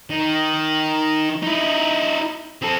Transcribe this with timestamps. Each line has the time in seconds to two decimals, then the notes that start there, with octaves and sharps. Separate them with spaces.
0.10 D#3
1.43 D#4 E4
2.62 C4 A4